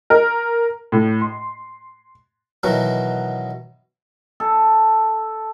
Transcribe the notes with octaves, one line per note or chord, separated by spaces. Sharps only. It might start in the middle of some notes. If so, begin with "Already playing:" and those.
A#4
A2
C6
B2 D#3 E3 F#3
A4